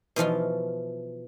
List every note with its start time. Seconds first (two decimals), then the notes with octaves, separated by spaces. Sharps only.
0.16 B2 E3 F3 F4